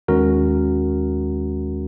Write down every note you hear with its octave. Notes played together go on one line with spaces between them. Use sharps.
D#2 D#3 G#3 C#4 F#4 A#4